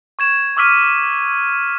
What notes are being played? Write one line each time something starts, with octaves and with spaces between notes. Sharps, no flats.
C#6 G#6 E7
C#6 D6 E6 F6 B6 D#7